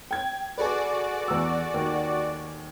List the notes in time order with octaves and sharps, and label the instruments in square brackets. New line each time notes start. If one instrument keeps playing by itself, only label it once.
[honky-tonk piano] G5 G#6
[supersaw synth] F#4 D5 [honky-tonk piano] G#4 A4 B4
[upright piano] E2 E6
D#2